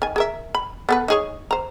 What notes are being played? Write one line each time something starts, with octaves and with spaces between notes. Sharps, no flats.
D#3 G#5
G#4 A#4 E5
B5
B3 A4 B4
D#4 G#4 C#5
C5 A#5